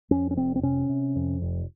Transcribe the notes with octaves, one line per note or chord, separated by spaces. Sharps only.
F2 C#4
C#4
F1 C4
C4
C3 C#4
C3
F2
F1